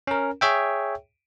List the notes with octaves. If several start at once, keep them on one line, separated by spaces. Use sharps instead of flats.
C#4 A#4
G#4 C#5 E5 G5